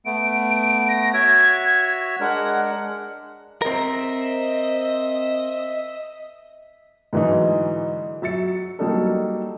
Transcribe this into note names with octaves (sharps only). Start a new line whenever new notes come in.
A3 B3 D7
A#6
F#4 C#5 E5 G#6
G#3 D4 A#4 F#5
C4 A#4 D#5 E5
G#2 D3 E3 F#3 G#3 D#4
F#3 E5 A6 C#7
F#3 G3 A#3 D4 D#4 A4